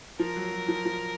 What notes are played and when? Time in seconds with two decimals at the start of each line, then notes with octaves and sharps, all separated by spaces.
0.19 F3 A#4
0.36 F#3
0.52 F#3
0.68 F3
0.85 F3